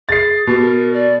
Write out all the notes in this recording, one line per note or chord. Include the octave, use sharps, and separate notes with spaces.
G#4 A6 C7
B2 G4
A#4
D5